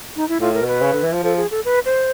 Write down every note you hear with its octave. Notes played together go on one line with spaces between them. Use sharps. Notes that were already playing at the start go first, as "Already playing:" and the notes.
D#4
E4
A2 F4
A#4
B2
B4
C#3
D3
E3
F3
F3 A4
G#4
A4
B4
C5